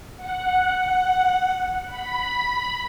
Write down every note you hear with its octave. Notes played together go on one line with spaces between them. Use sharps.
F#5
B5